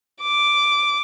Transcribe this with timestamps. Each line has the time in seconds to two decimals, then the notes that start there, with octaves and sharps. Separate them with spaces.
0.22 D6